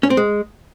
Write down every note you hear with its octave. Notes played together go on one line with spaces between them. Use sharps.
C#4
C4
G#3